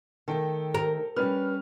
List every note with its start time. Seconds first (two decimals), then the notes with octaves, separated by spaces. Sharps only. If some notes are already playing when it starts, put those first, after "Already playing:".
0.28 D#3 A3 A4 G5
0.74 A#4
1.16 G3 C#4 B4 F6